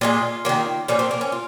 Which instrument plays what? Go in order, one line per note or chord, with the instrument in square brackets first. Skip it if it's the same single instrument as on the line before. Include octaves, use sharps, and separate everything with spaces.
[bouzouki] A#2 F3 G#3 F4
F#3 A#3
D#3
A#2 F3 A#3 C#4
C4
A#3
C#4
F4